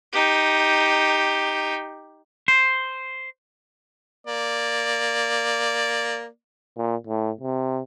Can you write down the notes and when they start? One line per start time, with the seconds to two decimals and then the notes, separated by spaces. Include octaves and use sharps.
0.13 D#4 G4
2.48 C5
4.27 A#3 D5
6.77 A#2
7.07 A2
7.41 C3